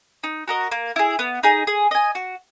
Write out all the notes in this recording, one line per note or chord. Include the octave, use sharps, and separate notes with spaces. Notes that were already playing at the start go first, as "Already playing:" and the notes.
D#4
F#4 A#4 D#5
A#3
E4 G#4
B3
D#4 G#4
G#4
D#5 G#5
F#4